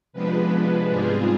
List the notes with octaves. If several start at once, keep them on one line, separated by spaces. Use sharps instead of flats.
C3 F3 G#3 B3 D4 B4
G#2 G3 C4 F4 G#4